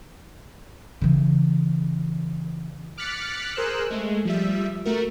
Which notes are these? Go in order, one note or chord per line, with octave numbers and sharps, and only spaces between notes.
C#3 E3
D6 F6 F#6 A6 B6 C#7
G#4 A#4 C5 E6 F#6
G#3 A3
F3 G3 E5
A3 F#4 A#4